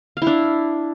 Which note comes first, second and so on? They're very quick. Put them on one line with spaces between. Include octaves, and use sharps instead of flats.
F5 E4 D4